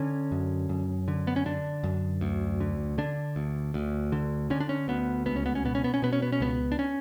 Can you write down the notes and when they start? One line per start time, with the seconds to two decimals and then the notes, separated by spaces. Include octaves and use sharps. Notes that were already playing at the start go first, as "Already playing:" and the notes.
Already playing: D3 C#4
0.32 F#2
0.69 F#2
1.08 D3
1.27 B3
1.36 C#4
1.46 D3 D4
1.84 F#2
2.21 D2
2.60 D3
2.98 D3 D4
3.36 D2
3.74 D2
4.12 D3
4.50 D3 C#4
4.60 D4
4.69 C#4
4.88 D2 B3
5.26 C#2 B3
5.36 C#4
5.46 B3
5.55 C#4
5.65 B2 B3
5.75 C#4
5.84 B3
5.94 C#4
6.02 B2 B3
6.13 C#4
6.22 B3
6.32 C#4
6.40 C#2 B3
6.72 D4
6.79 C#4